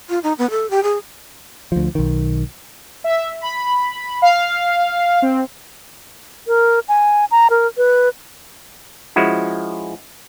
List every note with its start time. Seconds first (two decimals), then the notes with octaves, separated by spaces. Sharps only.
0.09 F4
0.23 D#4
0.38 B3
0.50 A4
0.70 G4
0.83 G#4
1.72 D2 F3
1.95 B1 D#3
3.04 E5
3.41 B5
4.22 F5
5.22 C4
6.47 A#4
6.88 G#5
7.31 A#5
7.50 A#4
7.77 B4
9.16 F3 G#3 C#4 E4 F#4